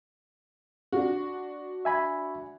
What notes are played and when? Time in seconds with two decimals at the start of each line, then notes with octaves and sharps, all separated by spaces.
0.92 D4 F#4
1.85 E5 G#5 B5